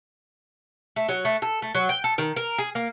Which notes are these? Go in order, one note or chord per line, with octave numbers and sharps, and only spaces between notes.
A3
F#3
A3
A4
A3
F#3
G5
A4
D#3
A#4
G#4
A#3